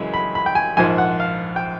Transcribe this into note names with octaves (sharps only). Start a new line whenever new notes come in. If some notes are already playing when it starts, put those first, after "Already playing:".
Already playing: F#2 C#3 E3 G#3 B5
B5
B5
G5
G#5
A#1 G#2 F3 G#5
F#5
F5
G5